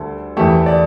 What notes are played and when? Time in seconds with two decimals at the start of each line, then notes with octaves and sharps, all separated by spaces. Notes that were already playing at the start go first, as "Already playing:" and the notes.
Already playing: D2 D3 G3 A4
0.37 E2 E3 A3 G4
0.66 D5